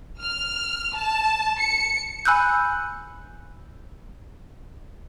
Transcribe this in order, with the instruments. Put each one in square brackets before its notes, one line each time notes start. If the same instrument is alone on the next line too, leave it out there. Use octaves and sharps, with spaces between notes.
[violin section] F6
A5
C#7
[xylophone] G#5 B5 E6 F#6 G6